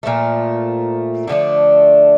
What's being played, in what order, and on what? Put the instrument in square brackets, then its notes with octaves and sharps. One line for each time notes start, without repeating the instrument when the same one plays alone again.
[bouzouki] A#2 F3 A3
D3 F3 A3 D4